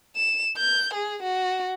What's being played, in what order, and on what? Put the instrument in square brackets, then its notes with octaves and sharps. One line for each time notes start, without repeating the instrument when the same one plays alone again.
[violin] E7
G6
G#4
F#4